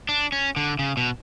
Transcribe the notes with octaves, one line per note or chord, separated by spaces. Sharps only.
D4
C#4
D3
C#3
B2